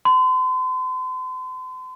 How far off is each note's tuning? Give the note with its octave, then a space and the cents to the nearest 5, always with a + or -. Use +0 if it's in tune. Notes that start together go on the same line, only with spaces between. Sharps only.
C6 -40